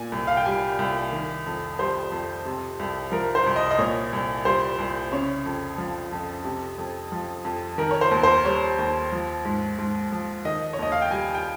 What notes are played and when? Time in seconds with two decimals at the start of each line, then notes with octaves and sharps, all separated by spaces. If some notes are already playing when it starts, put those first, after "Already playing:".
Already playing: A#2 G#5
0.12 C2
0.27 F5
0.37 G5
0.46 G3 G#5
0.79 C2
1.12 D#3
1.46 F2
1.79 G3 C5
2.12 F2
2.46 C3
2.79 C2
3.12 F3 A#4
3.35 C5
3.46 C2
3.56 D#5
3.71 D#5
3.78 A#2 C#5
4.13 C2
4.45 G3 C5
4.78 C2
5.12 C#3 C#5
5.45 F2
5.78 F3
6.12 F2
6.45 C3
6.78 F2
7.12 F3
7.45 F2
7.78 D#3 A#4
7.91 C#5
8.01 C5
8.11 D#2
8.23 C5
8.45 G3 C#5
8.79 D#2
9.12 F3
9.45 G#2
9.78 G#2
10.12 F3
10.45 D#3 D#5
10.73 C#5
10.79 D#2 D#5
10.92 F5
11.02 G5
11.11 G3 G#5
11.34 G5